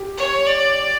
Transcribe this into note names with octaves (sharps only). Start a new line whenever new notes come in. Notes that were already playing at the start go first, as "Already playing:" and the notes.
Already playing: G4
C#5
D5